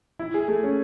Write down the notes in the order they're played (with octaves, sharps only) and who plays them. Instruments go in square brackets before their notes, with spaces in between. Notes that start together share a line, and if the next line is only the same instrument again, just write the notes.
[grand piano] E4
G#4
A3
C#4